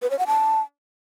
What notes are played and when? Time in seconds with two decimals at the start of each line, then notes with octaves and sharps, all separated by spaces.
0.02 B4
0.10 C#5
0.19 F#5
0.27 A5